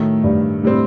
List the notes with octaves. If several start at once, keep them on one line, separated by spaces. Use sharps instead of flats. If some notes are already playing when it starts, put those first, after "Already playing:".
Already playing: A2 D#3 F#3 A3
G2
A2 C3 G3 C4